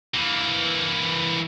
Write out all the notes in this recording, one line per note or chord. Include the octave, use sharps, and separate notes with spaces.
E3 A#3